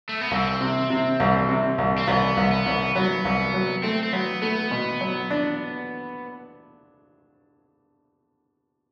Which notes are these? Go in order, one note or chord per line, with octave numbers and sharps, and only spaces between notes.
A3
B3
C2 C4
C3
C3
C2
C3
C2
C4
C2 B3
C2
B3
C2
F#3 B3
C2
F#3
A3 C4
C4
F#3 B3
A3 B3
B2
F#3
D4